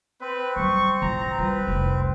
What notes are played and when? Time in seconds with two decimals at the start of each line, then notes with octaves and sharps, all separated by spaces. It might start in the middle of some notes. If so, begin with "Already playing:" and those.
0.21 C4 B4
0.56 F#3 G3 C#6
1.02 A#2 E3 A#5
1.38 G3 F4 B4
1.67 F1 C2